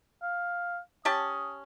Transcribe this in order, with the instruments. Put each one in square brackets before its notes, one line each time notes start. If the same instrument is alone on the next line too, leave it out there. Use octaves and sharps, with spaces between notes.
[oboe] F5
[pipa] C#4 G4 A5 [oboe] D#6